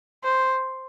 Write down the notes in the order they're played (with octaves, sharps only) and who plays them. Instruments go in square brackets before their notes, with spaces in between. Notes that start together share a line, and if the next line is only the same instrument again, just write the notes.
[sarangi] C5